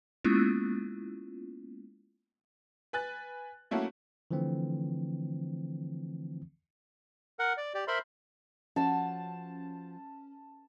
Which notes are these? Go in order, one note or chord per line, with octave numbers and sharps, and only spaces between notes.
G#3 A#3 B3 C#4 E4 F4
B4 G#5 F#6 A6
F#3 A3 A#3 C#4 E4 F#4
D3 E3 F3 A3 C4
A#4 F#5
D5
G4 D5
A#4 C5 E5 B5 C6
F3 C#4 F#4 A5